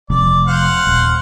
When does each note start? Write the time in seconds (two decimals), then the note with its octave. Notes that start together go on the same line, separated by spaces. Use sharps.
0.10 F1 D5
0.47 C5 F5 F#5
0.87 D#1